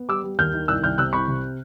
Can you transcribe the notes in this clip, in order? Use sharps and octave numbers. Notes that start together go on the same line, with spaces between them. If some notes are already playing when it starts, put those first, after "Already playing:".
Already playing: B3
G3 D6 E6
G3
D#2 F6 G6
D#3
C2 E6 F#6
C2 F6 G6
C3 E6 F#6
C2 B5 C#6
C3